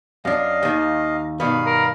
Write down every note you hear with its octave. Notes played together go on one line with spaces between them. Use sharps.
F#2 D4 D#5 F5
D#2 D#3
G2 B2 D#3 F5 B5
A#4